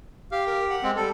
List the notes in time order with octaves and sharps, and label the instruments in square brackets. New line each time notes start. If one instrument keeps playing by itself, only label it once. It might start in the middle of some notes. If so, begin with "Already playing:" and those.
[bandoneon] G4 [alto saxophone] F5
[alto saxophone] A#4
F#5
[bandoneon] G#3 C4
[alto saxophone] G3 [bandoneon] A4